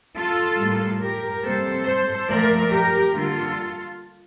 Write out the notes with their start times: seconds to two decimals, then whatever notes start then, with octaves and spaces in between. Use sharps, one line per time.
0.17 F4 A4
0.59 A2 G3 A#3
1.02 G4 A#4
1.44 C3 G3 A#3 A4 C5
1.87 A4 C5
2.29 A#2 F3 A3 A#4 D5
2.72 G4 A#4
3.14 D3 G3 A#3 F4 A4